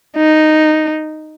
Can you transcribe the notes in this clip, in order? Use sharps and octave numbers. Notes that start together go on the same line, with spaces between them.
D#4